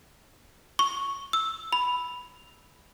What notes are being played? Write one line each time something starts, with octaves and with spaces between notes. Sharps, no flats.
C#6
E6
B5